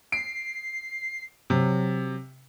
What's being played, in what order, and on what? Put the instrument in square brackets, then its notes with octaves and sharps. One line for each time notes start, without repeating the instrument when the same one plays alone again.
[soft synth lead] C7 [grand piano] D7
[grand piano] C3 [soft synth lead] F#3